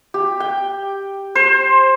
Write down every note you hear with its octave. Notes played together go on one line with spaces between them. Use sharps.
G4
G5
C5